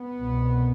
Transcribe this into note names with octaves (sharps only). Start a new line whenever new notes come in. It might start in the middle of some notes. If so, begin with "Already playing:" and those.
Already playing: B3
C2 B2